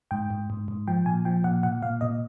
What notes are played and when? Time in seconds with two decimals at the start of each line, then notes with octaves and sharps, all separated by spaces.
0.11 G#2 G5
0.30 G#2
0.50 G#2
0.68 G#2
0.88 F3 G5
1.06 A#2 G#5
1.25 F3 G5
1.44 A#2 F#5
1.63 A#2 F#5
1.82 A#2 F5
2.01 A#2 D#5